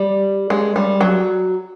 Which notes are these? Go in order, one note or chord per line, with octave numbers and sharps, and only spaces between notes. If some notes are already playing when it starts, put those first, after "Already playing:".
Already playing: G3
G#3
G3
F#3